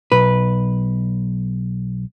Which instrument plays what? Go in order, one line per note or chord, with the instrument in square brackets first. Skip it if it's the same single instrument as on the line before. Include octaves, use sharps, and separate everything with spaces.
[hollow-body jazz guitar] B1 B4